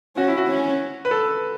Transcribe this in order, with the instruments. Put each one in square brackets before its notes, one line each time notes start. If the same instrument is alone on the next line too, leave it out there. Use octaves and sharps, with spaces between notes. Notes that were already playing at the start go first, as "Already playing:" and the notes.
[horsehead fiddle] C#4 [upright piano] F#4
[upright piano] E4
F#4
[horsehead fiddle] C#4
[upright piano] B4
A4